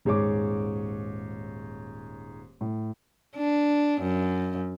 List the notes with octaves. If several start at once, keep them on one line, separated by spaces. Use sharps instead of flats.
D#1 G#2 G#3 C#5 C#6 D6
A2
D4
F#2